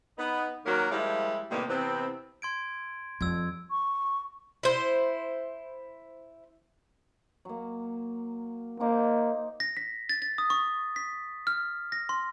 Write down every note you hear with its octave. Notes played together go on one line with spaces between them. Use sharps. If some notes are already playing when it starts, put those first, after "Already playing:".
B3 D#4
D#3 F#3 A#3 C#4 A#4 C#5
F3 G3 G#3 A#3 E4
A2 C3 D#3 G3 A#3 B3
C3 E3 B3 C4
C6 G#6 D7
F2 G3 E6 G#6
C#6
E4 C5
F#3 A#3
A#3 D#4 C5 D6
A#6
B6
A6
A6
D#6
C#6
B6
F6
A#6
C6